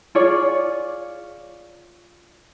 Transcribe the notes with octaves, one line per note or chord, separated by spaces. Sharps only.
F4 G#4 C#5 D5